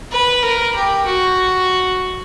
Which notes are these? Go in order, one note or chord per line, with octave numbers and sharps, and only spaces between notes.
B4
A#4
G4
F#4